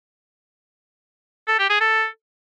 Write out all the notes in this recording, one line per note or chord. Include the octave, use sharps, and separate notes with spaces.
A4
G4
G#4
A4